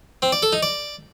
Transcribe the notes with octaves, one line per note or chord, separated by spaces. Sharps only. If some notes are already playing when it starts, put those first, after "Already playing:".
C4
D5
A4
D#4
D5